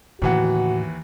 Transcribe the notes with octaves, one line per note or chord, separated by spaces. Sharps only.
D#2 A2 C#3 E3 F#4 F#5